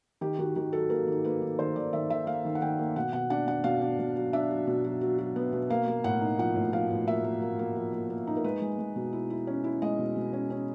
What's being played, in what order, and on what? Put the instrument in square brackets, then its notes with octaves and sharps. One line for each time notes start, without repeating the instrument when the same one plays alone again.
[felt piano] D#3 G4
D#3 F#4
D#3 G4
F#3 A4
A#3 A#4
D#3
A#3 B4
D#3
D#3 C5
D#3 D5
D#3 E5
D#3 E5
A#3 F5
D#3
F#5
D#3 G5
A#3
B2 F#5
B2 F#5
D4 F#5
D4 F#5
B2 F5
D4
B2
F#3
D4 E5
F#3
B2
F#3
F#3
F#3
B3
B2
A#3 F5
A#3
A2 F#5
D#4
F3 F#5
A2
F3 F5
A2
A#3 E5
A#3
A#3
A#3
F3
A#3
A#3
D#4
A#4
G#3 B4
G#3
G#3
B2
E4
E4
C#4
E4
G#3 D#5
B2
B2
C#4
C#4